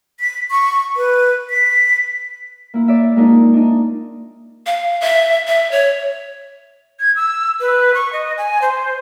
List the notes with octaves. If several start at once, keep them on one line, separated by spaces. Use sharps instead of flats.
B6
C#6
B4
B6
A#3 E4
D5 E5
G#3 A#3 D4 D#4 F4 A#4
D4 D#4
F5
E5
E5
C#5
G#6
E6
B4
C#6
D#5
G#5
C5